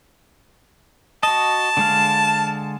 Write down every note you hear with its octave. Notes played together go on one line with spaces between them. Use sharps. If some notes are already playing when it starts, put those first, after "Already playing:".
F#4 D#5 A5
D3 G#3 F5